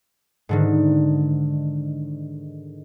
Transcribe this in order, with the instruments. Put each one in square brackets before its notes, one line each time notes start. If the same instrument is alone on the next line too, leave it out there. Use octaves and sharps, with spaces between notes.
[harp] G#2 D3 D#3